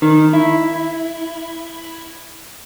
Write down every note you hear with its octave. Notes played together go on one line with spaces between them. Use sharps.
D#3
E4